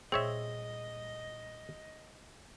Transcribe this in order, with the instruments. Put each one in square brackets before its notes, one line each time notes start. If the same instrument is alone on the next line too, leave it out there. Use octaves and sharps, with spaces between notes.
[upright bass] A#2 G3 [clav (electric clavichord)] C4 C#5 E5 [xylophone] G#4 [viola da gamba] D#5